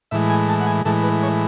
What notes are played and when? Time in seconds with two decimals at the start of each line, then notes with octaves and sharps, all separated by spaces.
0.11 A2 E3 G#3 E5
0.30 G#5
0.49 A5
0.61 F#5
0.67 G#5
0.85 A2 E3 G#3 A4
1.03 B4
1.23 C#5